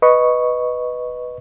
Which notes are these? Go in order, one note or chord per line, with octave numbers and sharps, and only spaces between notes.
B4 D#5 C#6